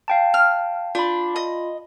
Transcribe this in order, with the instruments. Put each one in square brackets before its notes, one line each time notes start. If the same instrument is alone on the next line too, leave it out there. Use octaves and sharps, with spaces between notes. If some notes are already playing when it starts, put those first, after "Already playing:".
[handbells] F5 G5 A5
[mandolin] F6
[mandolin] D4 [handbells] F4 B5
[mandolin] D#5